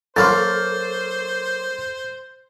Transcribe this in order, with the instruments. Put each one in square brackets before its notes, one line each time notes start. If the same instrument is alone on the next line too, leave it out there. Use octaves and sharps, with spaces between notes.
[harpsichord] F#3 A#3 [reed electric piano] A4 [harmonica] C5 [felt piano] C6 F6 A6